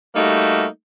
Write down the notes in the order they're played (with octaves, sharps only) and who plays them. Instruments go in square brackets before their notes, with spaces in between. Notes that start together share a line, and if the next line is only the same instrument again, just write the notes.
[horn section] G3 A3 A#3 D#4 F#4